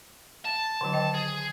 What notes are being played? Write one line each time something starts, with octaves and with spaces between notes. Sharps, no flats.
A5
D3 D#3 F#3
D#5 G5
G#4